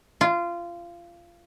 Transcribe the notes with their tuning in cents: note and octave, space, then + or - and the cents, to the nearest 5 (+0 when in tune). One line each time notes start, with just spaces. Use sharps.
F4 -20